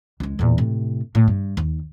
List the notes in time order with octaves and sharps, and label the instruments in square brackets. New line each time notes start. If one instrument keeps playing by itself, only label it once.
[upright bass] C#2 G#3
E2 A#2
A2 C3
A2
G2
D#2